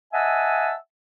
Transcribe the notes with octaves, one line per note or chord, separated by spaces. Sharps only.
D#5 E5 F#5 G#5 A5 E6